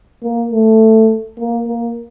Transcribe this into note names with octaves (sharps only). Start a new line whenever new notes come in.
A#3
A3
A#3
A#3